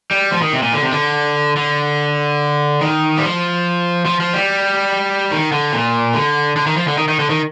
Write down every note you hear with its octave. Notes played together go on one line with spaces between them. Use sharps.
G3
F3
D#3
C3
A#2
D3
C3
D3
D3
D#3
G3
F3
F3
F3
G3
D#3
D3
A#2
D3
D3
D#3
F3
D3
D#3
D#3
D3
D#3